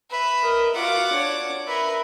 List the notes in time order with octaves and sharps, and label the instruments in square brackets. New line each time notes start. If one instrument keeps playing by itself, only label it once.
[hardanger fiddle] B4 E5
[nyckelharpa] A#4 D#5
[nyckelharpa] F4 F#4 [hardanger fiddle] F#5 D6
[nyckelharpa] D4 C#5
[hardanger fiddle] A#4 B4 [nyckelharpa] E5